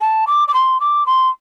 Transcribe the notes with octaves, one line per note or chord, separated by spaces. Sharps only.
A5
D6
D6
C6
D6
C6